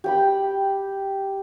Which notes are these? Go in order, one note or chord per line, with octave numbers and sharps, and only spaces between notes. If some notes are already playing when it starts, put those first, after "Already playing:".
G4 G5 B5